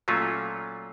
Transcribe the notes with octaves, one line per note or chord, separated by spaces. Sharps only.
A#2 F#3 A3 C#4 F4